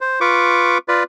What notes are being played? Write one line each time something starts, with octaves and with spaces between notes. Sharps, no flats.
C5
F4 B4 C#6 D6
F4 B4 D5